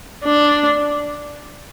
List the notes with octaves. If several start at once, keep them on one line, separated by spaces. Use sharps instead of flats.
D4